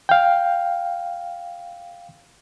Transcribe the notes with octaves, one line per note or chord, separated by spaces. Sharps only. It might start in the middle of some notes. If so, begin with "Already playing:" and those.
F5 G5